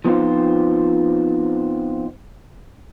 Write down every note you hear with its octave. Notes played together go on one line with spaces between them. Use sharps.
F3 B3 C4 D#4 F4 C5